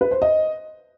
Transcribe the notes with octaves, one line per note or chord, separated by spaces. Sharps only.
B4
C5
D#5